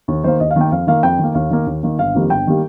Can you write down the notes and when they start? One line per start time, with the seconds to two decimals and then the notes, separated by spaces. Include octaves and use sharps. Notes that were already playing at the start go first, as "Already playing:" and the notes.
0.08 D#2
0.24 D#3 A#3 C5
0.40 D#2 D#5
0.51 F5
0.56 D#3 A#3 G5
0.72 F2 F5
0.87 D#3 A#3 F5
1.03 F2 G5
1.19 D#3 A#3
1.35 D#2 F5
1.51 D#3 A#3
1.66 D#2
1.83 D#3 A#3
1.99 G1 F5
2.14 F2 D#3 G3 A#3
2.30 G1 G5
2.47 D#3 G3 A#3